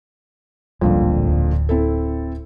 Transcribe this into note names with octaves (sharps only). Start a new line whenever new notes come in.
D1 A1 F2 A#2 D3 G3
D1
C4 E4 A4